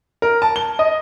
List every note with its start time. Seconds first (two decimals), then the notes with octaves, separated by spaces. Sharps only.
0.22 A#4
0.42 A5
0.56 G7
0.79 D#5